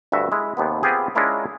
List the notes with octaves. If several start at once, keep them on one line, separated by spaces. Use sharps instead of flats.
D2 G2 F#4 E5
G#3 E4
D#2 C3 B3
B3 C4 F4 G4 G#4
G#3 C#4 D4 E4 F4 A#4